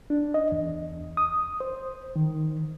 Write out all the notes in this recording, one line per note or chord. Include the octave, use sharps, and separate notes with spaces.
D4
D#5
E2
D#6
C5
D#3